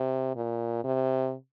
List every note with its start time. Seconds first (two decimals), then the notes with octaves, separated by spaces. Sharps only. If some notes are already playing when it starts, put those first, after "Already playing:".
Already playing: C3
0.36 A#2
0.84 C3